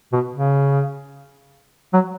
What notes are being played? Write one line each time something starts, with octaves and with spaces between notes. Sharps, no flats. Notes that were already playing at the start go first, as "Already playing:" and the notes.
B2
C#3
F#3